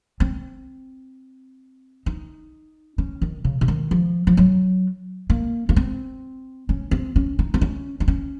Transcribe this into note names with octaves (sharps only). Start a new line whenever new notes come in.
C4
D#4
C#4
D#3
C#3
C#3
D#3
F3
F3
F#3
A#3
A#3
C4
C#4
C4
C#4
D#4
C4
C#4
D#4
C#4